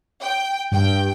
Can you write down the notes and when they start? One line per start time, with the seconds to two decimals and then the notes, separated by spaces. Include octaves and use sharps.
0.22 G5
0.72 G2 G5